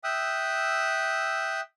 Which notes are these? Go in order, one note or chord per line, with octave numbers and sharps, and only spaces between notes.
E5 G5 D#6 E6 F#6